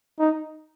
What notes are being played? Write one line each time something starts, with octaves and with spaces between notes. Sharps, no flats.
D#4